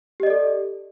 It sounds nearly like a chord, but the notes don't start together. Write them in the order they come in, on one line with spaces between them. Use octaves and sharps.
G4 D#5 D5 A4